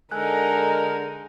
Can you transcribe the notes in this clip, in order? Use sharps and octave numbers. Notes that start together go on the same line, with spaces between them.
D3 G#3 D#4 A4 A#4 G#5 F#6